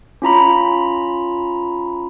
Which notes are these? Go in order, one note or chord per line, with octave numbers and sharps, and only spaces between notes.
C#4 F4 A#5 B5